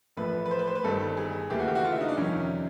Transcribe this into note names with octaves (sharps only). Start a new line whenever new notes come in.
A1 A2 F3 A3 B4
B4
C5
B4
C5
B4
G1 G2 D#3 A4
G#4
D#2 C#3 E3 A3 G4
F#4
G4
F#4
F4
E4
D#4
D4
F2 C3 D#3 G3 C#4